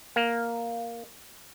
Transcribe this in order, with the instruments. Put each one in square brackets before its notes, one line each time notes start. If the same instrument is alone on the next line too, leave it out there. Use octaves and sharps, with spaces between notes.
[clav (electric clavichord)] A#3